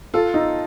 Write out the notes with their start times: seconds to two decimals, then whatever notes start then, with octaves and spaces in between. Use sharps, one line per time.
0.14 F4 A4
0.34 D#4